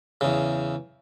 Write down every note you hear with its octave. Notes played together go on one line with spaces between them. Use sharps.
E2 C#3